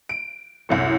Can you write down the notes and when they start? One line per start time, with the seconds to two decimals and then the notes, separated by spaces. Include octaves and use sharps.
0.09 D7
0.69 C2 F#2 A2